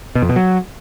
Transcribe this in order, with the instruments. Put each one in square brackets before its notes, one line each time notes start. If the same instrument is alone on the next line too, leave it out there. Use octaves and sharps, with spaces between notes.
[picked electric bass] B2
F2
B2
F#3